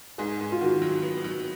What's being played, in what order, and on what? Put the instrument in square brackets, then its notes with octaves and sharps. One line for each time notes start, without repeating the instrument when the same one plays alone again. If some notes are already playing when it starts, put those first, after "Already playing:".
[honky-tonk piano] G#2 [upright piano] G#4
[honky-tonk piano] G#2
[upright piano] F4
[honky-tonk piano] D#3 [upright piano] F#4
[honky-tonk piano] F#3
B3
F#3